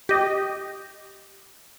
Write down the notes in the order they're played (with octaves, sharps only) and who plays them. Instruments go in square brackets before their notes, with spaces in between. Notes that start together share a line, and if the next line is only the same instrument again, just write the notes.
[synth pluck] G4 D#5